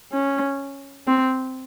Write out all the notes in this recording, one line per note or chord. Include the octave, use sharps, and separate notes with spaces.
C#4
C4